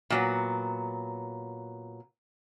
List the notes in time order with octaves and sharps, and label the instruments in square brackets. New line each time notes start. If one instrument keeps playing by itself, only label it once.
[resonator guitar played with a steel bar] A#2 F#3 B3